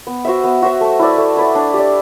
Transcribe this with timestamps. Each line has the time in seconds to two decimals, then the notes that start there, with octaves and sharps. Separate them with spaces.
0.07 B3
0.25 F#4 C5 E5
0.44 B3
0.62 F#4 C5 E5
0.81 A3
0.99 E4 B4 D5
1.18 A3
1.37 E4 B4 D5
1.55 D4
1.74 G4 D5